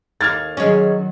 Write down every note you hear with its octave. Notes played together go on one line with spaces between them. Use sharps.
D#2 A#3 F6 G#6 A6
D#3 F#3 G#3 C#4